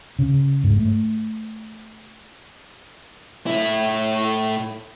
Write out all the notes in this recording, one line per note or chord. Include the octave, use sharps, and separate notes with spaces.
C#3
G#2
A3
A2 E4